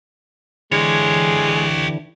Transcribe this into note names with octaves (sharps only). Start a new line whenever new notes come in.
D3 E3 G#3 G4 C#5